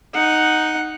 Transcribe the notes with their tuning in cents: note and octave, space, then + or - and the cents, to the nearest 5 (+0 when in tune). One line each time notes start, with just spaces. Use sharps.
D#4 +0 F#5 +0